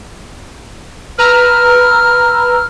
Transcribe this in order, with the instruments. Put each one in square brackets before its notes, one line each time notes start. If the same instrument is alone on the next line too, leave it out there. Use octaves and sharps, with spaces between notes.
[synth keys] B4 A#5 E6 [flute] F6